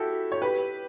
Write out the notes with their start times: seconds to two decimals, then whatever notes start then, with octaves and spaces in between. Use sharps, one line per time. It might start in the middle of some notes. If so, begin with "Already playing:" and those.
Already playing: E4 F#4 G4 A4
0.32 C#5
0.42 G4 B4